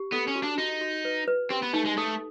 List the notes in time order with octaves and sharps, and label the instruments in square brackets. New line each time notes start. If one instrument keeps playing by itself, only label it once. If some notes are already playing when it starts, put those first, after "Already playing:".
Already playing: [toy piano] G4
[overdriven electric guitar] B3 [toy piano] A4
[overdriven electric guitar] C#4
[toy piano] F#4
[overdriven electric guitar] D4
[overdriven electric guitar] D#4 [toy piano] F#4
[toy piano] F#4
B4
B4
[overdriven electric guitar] C4 [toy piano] G4
[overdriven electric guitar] B3
[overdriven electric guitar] A3 [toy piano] D#4
[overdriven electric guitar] G#3
[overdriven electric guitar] A3 [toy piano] A4